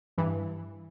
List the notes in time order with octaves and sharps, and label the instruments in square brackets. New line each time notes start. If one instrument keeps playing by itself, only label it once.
[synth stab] G2 E3